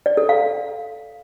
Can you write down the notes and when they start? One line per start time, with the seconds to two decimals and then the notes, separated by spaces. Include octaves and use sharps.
0.06 D5
0.17 A4
0.29 F5